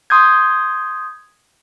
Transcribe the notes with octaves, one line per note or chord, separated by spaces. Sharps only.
C6 D#6 G6 G#6